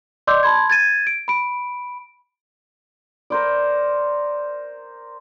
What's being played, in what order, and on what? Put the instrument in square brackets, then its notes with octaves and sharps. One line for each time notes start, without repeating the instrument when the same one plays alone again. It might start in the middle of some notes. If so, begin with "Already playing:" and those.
[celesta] D5 D#5 C6 D6 E6 G6
A5 B5 C6 G#6
G#6 A6 D#7
D7
B5 D7
[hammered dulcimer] A#4 C5 D5